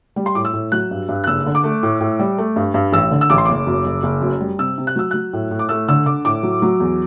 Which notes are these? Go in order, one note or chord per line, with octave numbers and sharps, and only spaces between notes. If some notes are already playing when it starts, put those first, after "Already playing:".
G3
C6
A2 D6
E6
A2
F#3 F#6
G2
G2
F#6
F#1 E6
D3
D6
A3
A2
A2
G3
A3
G2
G2
A1 E6
D3
E6
A1 D6
C6
F#1 D6
F#2
F#1
F#1
F#2
G3
C3 E6
C3
F#6
F#3 E6
F#3 F#6
A2
A2
D6
A3 E6
D3 E6
D3 D6
A2 D6
F#3
F#3
E2